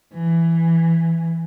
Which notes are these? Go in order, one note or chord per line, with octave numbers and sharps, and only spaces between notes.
E3